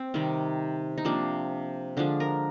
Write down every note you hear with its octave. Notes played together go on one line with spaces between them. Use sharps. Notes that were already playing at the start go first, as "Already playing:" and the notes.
Already playing: C4
C3 D#3 G3
D#4
C3 F3 A#3 D4
D3 F3 G#3 D4
A#4